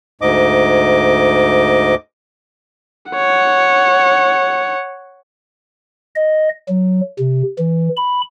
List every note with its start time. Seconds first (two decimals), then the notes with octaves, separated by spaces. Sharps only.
0.21 D2 G#2 D#5 D6
3.12 C#5 F#5
6.16 D#5
6.68 F#3
7.19 C3
7.59 E3
7.97 B5